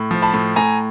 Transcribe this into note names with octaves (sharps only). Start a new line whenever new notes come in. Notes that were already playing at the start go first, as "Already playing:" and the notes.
Already playing: A2
F3
A5 B5
A2
A2 G#5 A#5